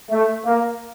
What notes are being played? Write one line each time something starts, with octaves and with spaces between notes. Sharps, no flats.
A3
A#3